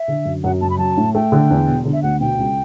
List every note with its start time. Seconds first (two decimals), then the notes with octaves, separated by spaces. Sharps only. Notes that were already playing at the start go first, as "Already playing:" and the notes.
Already playing: E5
0.08 D3
0.25 F#2
0.44 F#2 F#5
0.61 F#1 A5
0.70 B5
0.78 F#3 A5
0.97 A2
1.15 A3 G5
1.32 D3
1.50 E2
1.67 E1
1.85 D3
1.93 E5
2.03 D2 F#5
2.20 B2 G5
2.39 C#2